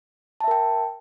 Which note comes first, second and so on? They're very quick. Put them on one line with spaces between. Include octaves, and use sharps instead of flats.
A5 E5 A#4 G5